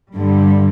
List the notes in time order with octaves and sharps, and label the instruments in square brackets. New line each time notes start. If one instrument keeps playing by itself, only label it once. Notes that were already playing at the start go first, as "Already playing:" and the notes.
[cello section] G2 D3 G3